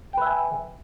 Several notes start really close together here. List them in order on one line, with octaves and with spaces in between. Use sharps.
G5 B4 E5 G#5